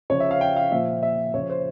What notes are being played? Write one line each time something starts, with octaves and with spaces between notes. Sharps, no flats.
C#3 F3 C#5
E5
F5
G5
F5
A#2 F3 E5
E5
C#3 F3 C#5
C5